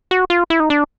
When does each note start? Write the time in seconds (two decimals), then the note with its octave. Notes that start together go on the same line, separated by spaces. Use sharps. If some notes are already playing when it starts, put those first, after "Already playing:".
0.11 F#4
0.30 F4
0.50 E4
0.60 D#4
0.70 D4